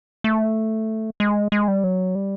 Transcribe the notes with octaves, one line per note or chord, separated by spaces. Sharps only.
A3
G#3
G#3
G3
F#3
G3